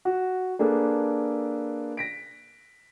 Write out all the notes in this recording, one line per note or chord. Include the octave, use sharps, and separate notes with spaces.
F#4
A#3 D4 G#4 A4 B4
A#6 B6 D7